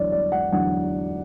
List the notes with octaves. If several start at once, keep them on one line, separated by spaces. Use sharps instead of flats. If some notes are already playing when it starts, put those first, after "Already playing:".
Already playing: E2 D3 F#3 C#5 D5
D5
F#5
E2 D3 F#3 F#5